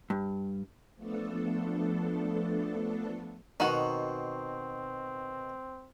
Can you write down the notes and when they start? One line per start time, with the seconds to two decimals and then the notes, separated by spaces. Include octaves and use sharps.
0.10 G2
0.96 F3 A3 B3 D4 A4
3.60 B2 D#3 C4 D#4 F#4 F#5